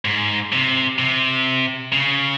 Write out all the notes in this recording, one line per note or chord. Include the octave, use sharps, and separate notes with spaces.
G#2
C3
C3
C#3